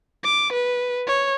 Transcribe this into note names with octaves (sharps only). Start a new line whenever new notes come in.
D6
B4
C#5